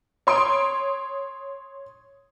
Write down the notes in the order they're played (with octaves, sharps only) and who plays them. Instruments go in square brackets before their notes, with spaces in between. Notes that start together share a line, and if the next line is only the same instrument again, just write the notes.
[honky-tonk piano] C#5 C6 D#6 D7